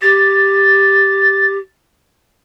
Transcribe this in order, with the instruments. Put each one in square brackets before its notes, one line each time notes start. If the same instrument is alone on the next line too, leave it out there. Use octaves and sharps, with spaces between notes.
[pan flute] G4 [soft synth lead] A6